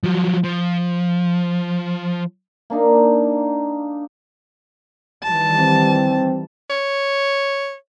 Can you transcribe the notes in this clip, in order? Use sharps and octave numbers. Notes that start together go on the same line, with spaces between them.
F3 F#3
F3
A#3 D4 D#4 F5
D#3 E3 G3 A5
C4
C#5